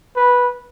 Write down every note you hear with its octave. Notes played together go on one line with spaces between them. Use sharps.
B4